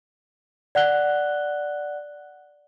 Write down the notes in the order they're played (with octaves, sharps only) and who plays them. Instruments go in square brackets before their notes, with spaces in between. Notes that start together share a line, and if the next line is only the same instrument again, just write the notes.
[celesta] D5 F#5 F#6 G7